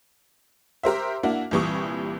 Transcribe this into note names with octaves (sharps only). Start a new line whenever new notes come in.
G4 A#4 C5 E5
A#3 D4 E4 F#4
C2 A#2 E3 G3 C#6 D#6